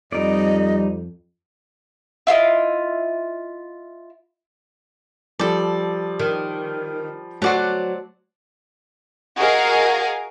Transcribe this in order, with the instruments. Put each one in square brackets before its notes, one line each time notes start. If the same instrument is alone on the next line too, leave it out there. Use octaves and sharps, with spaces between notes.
[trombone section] F2 [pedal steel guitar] G3 D#4 D5 [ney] D#5
[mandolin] E4 F4 A4 D#5
[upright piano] F3 G3 [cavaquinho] A4 D5
[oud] D#3
[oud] F#3 [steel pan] A3 F#4 [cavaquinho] C5 D5 A5
[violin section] F#4 G#4 A#4 D#5 F5